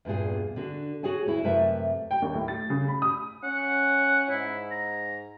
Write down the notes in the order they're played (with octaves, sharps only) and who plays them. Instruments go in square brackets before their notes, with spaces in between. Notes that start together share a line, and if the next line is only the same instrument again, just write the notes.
[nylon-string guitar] E2 G2 A#2 G#4
D3 D4 F#4
F#4 G#4 C#5 G#5
D2 E4
F#2 C3 A3 B4 E5
[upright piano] G5
D#2
A2
A6
C#3
B5
D#6
[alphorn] C#4 [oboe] F#5
[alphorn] G#2 [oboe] E4
[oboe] A#5